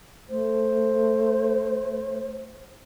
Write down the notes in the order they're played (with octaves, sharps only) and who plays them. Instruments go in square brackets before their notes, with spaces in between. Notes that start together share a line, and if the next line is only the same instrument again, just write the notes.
[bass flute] A3 [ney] C5